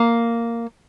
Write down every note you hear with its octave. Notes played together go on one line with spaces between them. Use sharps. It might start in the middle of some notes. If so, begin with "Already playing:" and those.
Already playing: A#3